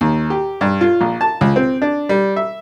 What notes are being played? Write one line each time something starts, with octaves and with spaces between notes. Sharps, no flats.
D#2
G4
G2
F4
A#1
A5
C#2
C4
D4
G3
E5